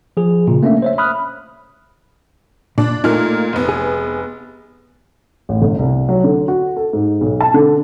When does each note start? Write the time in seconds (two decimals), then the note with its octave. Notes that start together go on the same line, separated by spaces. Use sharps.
0.17 F3 G#4
0.48 A#2 C#3
0.63 A3 A#3 C#4 D4 E5
0.82 C5 C#5 E5
0.98 B5 D#6 F6 F#6
2.78 A#2 D4
3.04 A#2 A3 A#3 D#4 F6
3.53 F1 B3
3.69 G#4
5.49 A1
5.62 G1
5.79 C2
6.09 F#3
6.24 D3
6.48 F#4
6.77 A4
6.93 G#2
7.21 B1
7.41 A5
7.54 D3